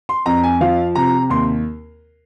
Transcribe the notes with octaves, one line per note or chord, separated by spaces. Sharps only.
C6
F2 A#5
G#5
F3 F5
C3 A#5
D#2 C6